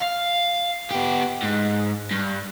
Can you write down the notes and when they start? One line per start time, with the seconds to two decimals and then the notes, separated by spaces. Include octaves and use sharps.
0.02 F5
0.91 B3 G4
1.42 G#2
2.11 G2